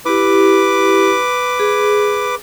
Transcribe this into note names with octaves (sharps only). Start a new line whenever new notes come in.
E4 G4 B4 D6
G#4